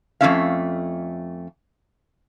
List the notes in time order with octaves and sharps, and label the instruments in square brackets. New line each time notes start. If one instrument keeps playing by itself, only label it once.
[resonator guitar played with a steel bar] F2 G#3 A3 C#4 E5 F5